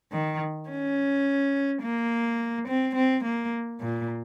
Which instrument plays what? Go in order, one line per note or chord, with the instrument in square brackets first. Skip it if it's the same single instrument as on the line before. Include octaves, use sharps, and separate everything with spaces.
[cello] D#3
C#4
A#3
C4
C4
A#3
A#2